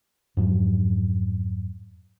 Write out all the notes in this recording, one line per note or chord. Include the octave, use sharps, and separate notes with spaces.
F2 G#2 F#3